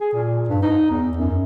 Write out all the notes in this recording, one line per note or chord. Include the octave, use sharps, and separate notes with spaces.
G#4
A#2
G2
D#4
E2
F#2